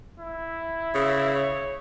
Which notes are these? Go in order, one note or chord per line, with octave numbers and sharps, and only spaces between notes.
E4
C#3
C#5